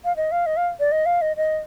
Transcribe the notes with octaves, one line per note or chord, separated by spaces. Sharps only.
F5
D#5
F5
D#5
F5
D5
D#5
F5
D#5
D#5